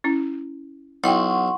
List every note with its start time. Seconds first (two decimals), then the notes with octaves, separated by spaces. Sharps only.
0.04 C#4 E4
1.04 B1 E4 D#5 F#5 G5 C6 C#6